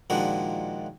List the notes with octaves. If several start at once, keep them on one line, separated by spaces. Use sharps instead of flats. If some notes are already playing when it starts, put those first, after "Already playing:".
A#2 D#3 F3 G#3 D4 F#4